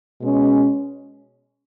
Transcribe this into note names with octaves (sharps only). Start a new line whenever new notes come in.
B2 G#3 C#4